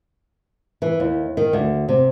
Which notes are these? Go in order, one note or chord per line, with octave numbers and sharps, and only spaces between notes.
E3
D#2
D#3
D2
C3